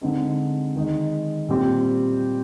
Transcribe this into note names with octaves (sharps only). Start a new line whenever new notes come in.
D3 G#3 C4 D#4
D#3 G#3 D#4
A#2 G3 C4 G4 C5